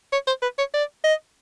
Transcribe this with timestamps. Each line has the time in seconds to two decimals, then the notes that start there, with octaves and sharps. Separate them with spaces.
0.13 C#5
0.27 C5
0.42 B4
0.58 C#5
0.74 D5
1.04 D#5